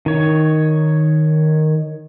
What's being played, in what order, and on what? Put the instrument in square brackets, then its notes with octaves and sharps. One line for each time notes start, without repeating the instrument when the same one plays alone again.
[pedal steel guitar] D#3 C#5